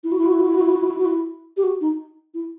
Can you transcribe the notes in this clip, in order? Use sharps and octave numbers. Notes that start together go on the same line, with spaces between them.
E4
F#4
E4
F#4
E4
F#4
E4
F#4
E4
F#4
E4
F#4
E4
F#4
E4
G4
F#4
D#4
E4